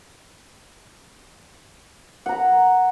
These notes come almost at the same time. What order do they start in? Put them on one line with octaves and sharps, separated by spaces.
F#5 A#5 B5